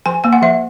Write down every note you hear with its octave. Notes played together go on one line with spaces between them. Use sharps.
F3 G#5
A#3 G#5
F#5
F3 E5